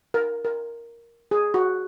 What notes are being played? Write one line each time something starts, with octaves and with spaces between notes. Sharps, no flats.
A#4
A#4
G#4
F#4